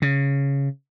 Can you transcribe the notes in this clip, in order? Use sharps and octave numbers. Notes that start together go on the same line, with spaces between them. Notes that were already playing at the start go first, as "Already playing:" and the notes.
C#3